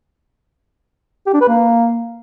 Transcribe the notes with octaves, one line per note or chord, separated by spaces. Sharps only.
G4
D4
B4
A#3